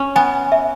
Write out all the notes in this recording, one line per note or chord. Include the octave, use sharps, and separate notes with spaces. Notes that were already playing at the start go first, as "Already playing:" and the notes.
Already playing: C#4
B3 G#5
E5